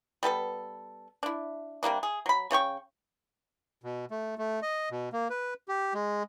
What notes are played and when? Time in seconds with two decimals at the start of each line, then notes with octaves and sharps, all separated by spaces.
0.23 G3 B3 A4 B4
1.23 D4 E4
1.83 C3 G3 A#3 D4
2.03 G#4
2.26 F#3 B5
2.51 C#3 C#5 G5 C#6
3.84 B2
4.11 A3
4.38 A3
4.62 D#5
4.91 B2
5.13 A#3
5.30 B4
5.68 G4
5.94 G#3